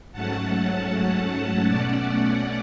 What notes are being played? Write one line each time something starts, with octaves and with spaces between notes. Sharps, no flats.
G#2 F#3 A3 C#4 F#5 A5
B2 A3 C#4 D5 F#5